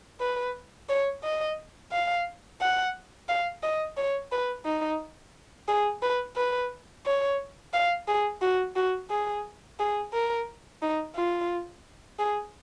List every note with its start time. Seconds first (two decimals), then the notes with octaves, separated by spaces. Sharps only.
0.20 B4
0.89 C#5
1.24 D#5
1.92 F5
2.61 F#5
3.28 F5
3.63 D#5
3.97 C#5
4.32 B4
4.65 D#4
5.68 G#4
6.02 B4
6.36 B4
7.06 C#5
7.73 F5
8.08 G#4
8.42 F#4
8.76 F#4
9.10 G#4
9.79 G#4
10.13 A#4
10.82 D#4
11.15 F4
12.19 G#4